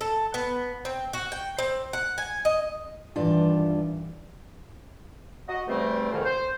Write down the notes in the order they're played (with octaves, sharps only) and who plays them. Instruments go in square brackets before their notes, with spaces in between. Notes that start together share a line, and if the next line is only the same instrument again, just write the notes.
[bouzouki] A4
B3
C4
F#4
G5
C4
F#5
G#5
D#5
[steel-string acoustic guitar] G2 D4 F4 [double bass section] D#3 E3 G3
[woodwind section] F#4 D#5
E2 G2 G3 A3 C4 C5
F2 G#2 B2 D#3
C5